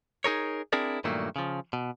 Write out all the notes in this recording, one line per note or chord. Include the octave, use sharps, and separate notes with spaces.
D#4 G#4 A#4 C#5
C4 D4 E4 G#4 A#4 D5
G2 A#2 D#3 F#3 A3 A#3
C#3 F3
B2